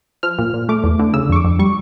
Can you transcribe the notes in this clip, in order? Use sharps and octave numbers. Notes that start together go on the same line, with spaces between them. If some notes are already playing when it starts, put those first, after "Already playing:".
F3 F6
A#2
A#2
A3 D6
E2
D3
C#3 E6
F2 C#6
D6
F2
G3 C#6